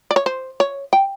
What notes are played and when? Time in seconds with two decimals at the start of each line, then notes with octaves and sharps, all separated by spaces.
0.11 D5
0.16 C#5
0.26 C5
0.60 C#5
0.93 G5